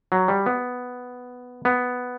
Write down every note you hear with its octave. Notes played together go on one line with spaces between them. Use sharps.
F#3
G3
B3
B3